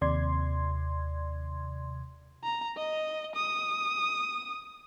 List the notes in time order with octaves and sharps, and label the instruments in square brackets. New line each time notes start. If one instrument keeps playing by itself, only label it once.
[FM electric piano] D#2 C3 D5 C6 G#6
[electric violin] A#5
D#5
D#6